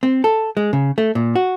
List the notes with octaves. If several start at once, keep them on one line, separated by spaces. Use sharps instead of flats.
C4
A4
G#3
C#3
A3
A#2
F#4